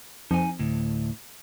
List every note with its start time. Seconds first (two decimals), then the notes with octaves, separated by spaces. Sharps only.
0.31 F2 D#4 G#5
0.59 D2 A2